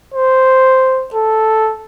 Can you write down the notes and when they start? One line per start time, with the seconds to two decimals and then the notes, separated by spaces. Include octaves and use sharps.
0.14 C5
1.14 A4